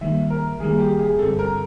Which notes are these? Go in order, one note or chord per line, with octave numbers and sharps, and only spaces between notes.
D#3 G3 A#3 E5
A#4
D#3 G3 A#3 G#4
G4
G#4
G2 D3 G3 C4 A4
A#4